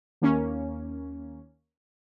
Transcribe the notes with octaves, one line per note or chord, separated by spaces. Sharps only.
D#2 A#3 C#4